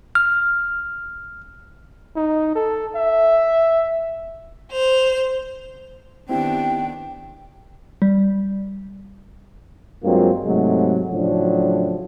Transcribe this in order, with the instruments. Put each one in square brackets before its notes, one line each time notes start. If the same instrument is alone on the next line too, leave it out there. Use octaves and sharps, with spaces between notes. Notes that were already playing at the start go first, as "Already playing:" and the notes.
[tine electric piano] F6
[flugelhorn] D#4
A4
E5
[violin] C5 F7
[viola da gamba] D#3 B3 D4 [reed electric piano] C4 E4 G4 [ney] G5
[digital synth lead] G3
[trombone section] G2 F#3 G#3 A#3 C4 F4
G#2 C3 F#3 G#3 A3
A2 C#3 F3 F#3 D4